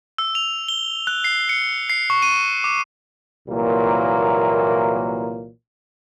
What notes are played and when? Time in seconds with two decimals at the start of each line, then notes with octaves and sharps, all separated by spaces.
0.18 E6
0.35 F7
0.68 G7
1.07 F#6
1.24 C7
1.49 C#7
1.90 C7
2.10 C#6
2.22 D#7
2.64 D6
3.48 C2 A#2 E3 F#3 A#3